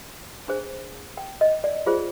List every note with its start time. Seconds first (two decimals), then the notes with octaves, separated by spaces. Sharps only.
0.48 D4 G#4 C5
1.17 G5
1.41 D#5
1.64 D5
1.86 F4 G#4 C5